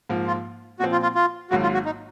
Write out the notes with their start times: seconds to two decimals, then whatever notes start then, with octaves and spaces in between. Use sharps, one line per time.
0.09 G#2 F3 A#3
0.27 F4
0.80 A#2 F3 C4 F#4
0.92 F4
1.03 F4
1.15 F4
1.50 G#1 G#2 F#3 A#3 F#4
1.63 F4
1.74 F#4
1.86 D#4